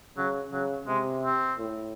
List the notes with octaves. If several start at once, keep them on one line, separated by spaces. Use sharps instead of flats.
C#3 F#3
C#3 F#3
C3 G#3
C4
A2